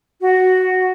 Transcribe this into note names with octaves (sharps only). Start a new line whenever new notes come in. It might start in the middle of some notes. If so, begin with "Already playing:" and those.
F#4